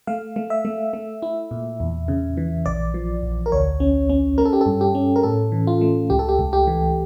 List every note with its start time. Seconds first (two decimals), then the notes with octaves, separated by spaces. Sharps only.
0.07 A3 F5
0.36 A3
0.50 E5
0.65 A3
0.93 A3
1.22 E4
1.51 A#2
1.80 E2
2.08 C#3
2.37 E3
2.66 A#1 D5
2.94 F3
3.23 A#1
3.46 A#4
3.52 D2 C#5
3.80 C#4
4.09 C#4
4.38 C#4 A#4
4.45 A4
4.53 G4
4.61 A4
4.66 G2
4.81 G4
4.95 C#4
5.16 A#4
5.23 A2 A4
5.52 E3
5.67 F4
5.81 A3
6.10 C#2 G4
6.19 A4
6.29 G4
6.39 C#2
6.53 G4
6.67 E3